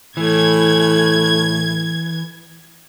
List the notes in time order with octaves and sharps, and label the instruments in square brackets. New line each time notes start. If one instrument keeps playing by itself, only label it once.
[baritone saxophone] A2 [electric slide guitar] E3 [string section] G#6